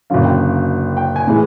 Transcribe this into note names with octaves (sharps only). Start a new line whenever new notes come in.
F#1 F#2 D3 F#3 F5
G5
G5
G#5
A2 E3 G#3